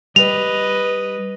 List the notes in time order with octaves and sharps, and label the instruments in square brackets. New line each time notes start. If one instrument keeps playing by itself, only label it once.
[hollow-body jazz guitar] G3 [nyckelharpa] B4 D#5 [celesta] F7